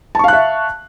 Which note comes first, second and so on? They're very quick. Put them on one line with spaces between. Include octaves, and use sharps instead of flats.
A5 C#6 F5 F#6 E5